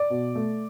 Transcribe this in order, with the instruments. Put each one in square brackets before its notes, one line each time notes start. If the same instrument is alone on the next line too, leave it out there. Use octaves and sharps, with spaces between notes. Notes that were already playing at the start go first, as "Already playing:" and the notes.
Already playing: [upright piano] D5
B2
A3